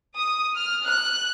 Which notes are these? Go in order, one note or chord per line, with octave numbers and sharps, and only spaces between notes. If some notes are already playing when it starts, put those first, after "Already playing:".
D#6
F6
F#6